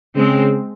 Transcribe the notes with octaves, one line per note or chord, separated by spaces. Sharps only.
C#3 G#3 C4